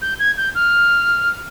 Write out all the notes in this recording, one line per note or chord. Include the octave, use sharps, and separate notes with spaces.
G6
G#6
G6
F6